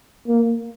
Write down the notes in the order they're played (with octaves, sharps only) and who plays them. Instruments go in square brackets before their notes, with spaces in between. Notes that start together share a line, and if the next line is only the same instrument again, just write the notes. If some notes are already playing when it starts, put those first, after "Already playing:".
[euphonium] A#3